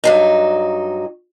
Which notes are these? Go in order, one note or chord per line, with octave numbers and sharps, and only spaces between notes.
G2 F#3 D#4